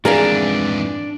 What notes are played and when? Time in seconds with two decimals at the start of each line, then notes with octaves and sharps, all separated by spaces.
0.05 F2 G#2 E3 D4 G#4 A#4 F5